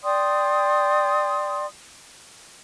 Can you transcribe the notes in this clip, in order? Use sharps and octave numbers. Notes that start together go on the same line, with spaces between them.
D5 G5 C6 D#6